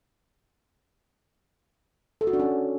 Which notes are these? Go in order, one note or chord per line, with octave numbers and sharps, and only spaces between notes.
A4
F#4
D4
C#4